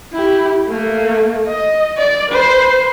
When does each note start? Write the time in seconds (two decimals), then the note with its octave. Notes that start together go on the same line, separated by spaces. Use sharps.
0.13 E4 G4
0.68 A3 A#3
1.47 D#5
1.98 D5
2.30 B4 C5